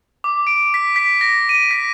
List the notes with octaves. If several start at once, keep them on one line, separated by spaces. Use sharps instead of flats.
D6
D7
B6
B6
A#6
D#7
B6